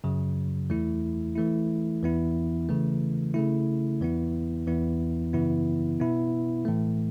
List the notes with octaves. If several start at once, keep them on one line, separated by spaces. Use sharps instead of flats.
F#2 C#3 F#3
E2 E3 A3 E4
E3 A3 E4
E2 E3 B3 E4
C#3 E3 A3
C#3 A3 E4
E2 E3 B3 E4
E2 E3 B3 E4
F#2 C#3 E3 B3 E4
B2 B3 E4
A2 E3 A3